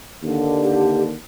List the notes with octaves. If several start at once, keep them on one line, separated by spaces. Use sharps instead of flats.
D#2 D3
G4